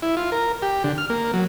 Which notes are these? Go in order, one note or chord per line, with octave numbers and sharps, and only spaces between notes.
E4
F4
A#4
G4
D3
F6
A#3
F#3